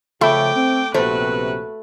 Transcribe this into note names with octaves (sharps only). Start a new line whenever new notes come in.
C#3 F3 A3 E5 G5 B5 D6
C4
A#1 C3 A3 B3 F#4 B4 C5